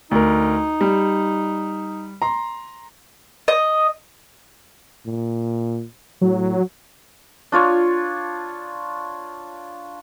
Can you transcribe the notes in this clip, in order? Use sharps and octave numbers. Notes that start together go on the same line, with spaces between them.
D2 D#4 A#4
G3
A#5 C6
D#5
A#2
A2 F#3
D4 F4 C#5